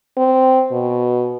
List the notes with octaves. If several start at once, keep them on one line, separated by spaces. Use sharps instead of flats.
C4
B2